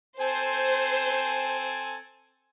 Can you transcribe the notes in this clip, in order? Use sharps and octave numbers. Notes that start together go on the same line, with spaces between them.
C4 A4 C5 G#5